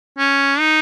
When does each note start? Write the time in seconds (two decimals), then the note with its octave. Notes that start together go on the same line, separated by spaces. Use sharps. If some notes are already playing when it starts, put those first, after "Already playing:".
0.18 C#4
0.60 D#4